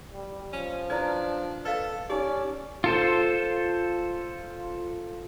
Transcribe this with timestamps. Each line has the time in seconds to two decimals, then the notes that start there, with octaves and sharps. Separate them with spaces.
0.13 G3
0.53 F3 C#4
0.90 D4 E4 B4 D5
1.65 A4 B4 D#5 F5
2.10 C#4 D#4 G4 D5
2.84 F4 A4 C5